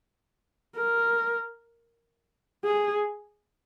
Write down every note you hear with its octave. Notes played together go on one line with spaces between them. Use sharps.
A#4
G#4